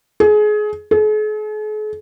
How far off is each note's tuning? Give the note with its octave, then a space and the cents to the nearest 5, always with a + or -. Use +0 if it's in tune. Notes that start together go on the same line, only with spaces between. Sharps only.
G#4 +25
G#4 +45